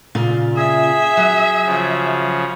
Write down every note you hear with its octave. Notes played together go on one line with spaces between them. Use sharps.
A#2 C#3 F4
G#4 E5
F#3
C#3 F3